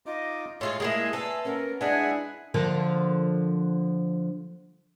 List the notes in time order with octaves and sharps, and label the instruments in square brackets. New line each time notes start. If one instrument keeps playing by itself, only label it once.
[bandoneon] D#4 F4 D6 [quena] D#5
[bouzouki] A2 F4 G#4 [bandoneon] G#3 [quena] C6
[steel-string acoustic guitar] A2 [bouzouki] G#3 A#3 E4 [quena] G#4 [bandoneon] A#5 C6
[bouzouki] A4 [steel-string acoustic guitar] B4 E5 [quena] G#5
[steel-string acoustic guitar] A#3 B3 C#4 [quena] A#4
[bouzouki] G#3 [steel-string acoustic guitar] D4 E4 [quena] G#4 [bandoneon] E5 F#5 G#5
[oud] D3 F3 A#3